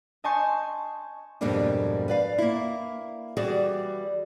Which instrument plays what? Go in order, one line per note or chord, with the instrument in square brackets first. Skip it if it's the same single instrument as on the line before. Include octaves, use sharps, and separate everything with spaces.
[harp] D#5 G#5 A5 C6 C#6 G6
[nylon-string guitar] F2 G#2 B2 G3 A#3 D4
B4 D5 F5
A#3 E4
E3 G3 F#4 G#4 D5